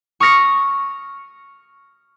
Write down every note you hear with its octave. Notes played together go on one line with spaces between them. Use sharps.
C#6 D#6 F6 A#6 C#7